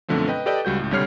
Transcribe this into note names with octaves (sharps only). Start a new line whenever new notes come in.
F#2 B2 D3 F3 A3 C4
B4 D#5 G5
G4 A4 B4 D5 D#5 G5
C#2 G3 F#4 G6
C#2 A2
C2 D3 G3 C#5 F6 C7